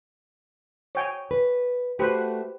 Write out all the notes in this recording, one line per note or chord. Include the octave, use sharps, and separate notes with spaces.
C#5 G5 G#5
B4
A3 F#4 G4 B4 C5